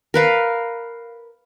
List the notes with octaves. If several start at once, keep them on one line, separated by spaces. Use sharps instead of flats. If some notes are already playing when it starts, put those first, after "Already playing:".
A#4 B4 F5